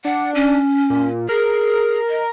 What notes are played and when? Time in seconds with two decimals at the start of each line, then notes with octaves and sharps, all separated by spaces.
0.05 D4 F#5
0.35 C#4
0.90 A#2
1.29 G#4 A#4
2.09 D#5